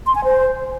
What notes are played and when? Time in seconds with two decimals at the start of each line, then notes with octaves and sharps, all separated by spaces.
0.06 C6
0.15 G#5
0.24 C5